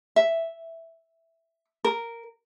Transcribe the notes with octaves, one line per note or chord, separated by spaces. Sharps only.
E5
A#4